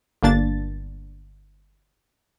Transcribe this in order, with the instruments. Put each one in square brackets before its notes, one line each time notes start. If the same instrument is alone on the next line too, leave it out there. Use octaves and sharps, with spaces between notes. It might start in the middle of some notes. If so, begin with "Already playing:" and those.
[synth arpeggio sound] G1 A#3 D4 A6